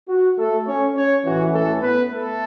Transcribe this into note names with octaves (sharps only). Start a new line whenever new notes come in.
F#4
A3 A4
C#4 C#5
C#4 C#5
A1 A2 E3 C#4 F#4
A3 A4
B3 B4
A3 A4